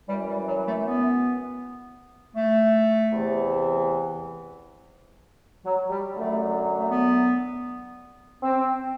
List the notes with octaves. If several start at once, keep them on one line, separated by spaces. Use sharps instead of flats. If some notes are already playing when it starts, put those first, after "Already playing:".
F#2 E3 G3
G3
F#3
A3
B3
A3
E2 C3 E3
F#3
G3
F#2 D3 F#3 A3
A3
B3
C4